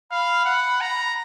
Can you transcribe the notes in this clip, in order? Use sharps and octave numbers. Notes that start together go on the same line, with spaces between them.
F5 B5
F#5
A#5